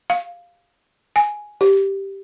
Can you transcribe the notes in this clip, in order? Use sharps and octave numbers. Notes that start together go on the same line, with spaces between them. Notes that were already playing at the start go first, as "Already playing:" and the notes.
F5
G#5
G4